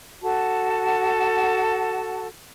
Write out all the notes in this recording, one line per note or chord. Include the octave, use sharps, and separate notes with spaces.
F#4 A4 F#5 A5